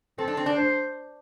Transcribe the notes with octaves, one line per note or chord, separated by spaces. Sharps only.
C4 A4
D4
C4
D4
C5